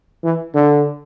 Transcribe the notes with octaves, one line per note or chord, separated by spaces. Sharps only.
E3
D3